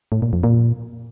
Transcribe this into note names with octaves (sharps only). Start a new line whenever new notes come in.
A2
A#2
F2
A#2